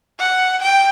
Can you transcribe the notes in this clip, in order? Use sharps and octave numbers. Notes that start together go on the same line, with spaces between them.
F#5
G5